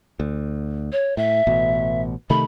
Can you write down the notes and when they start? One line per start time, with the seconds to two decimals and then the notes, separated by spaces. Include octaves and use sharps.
0.20 D2
0.92 C#5
1.17 A2 E5
1.47 A1 B2
2.30 C3 D#3 A3 B5